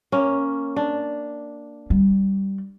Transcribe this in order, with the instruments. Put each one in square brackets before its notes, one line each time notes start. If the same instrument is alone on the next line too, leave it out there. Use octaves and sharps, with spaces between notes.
[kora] A#3 C#4
D4
[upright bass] G3